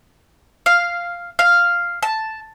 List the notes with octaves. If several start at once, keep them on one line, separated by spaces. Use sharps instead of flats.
F5
F5
A5